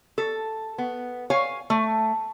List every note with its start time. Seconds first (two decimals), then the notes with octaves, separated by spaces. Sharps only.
0.18 A4
0.78 B3
1.30 C#5 F5 G#5
1.70 A3